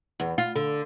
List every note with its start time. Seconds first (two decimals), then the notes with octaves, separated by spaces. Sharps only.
0.20 E2
0.38 F4
0.56 D3